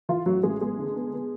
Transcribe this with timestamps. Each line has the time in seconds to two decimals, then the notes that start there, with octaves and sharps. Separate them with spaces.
0.09 E3 F4
0.26 A1 F#3 F#4
0.43 A1 G#3 G#4
0.61 G#3 B3 G#4
0.79 D3
0.96 B3
1.13 B3